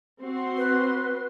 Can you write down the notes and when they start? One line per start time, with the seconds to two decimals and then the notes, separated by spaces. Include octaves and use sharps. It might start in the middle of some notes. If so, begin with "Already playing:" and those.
0.20 C4 F#4 C6
0.57 B4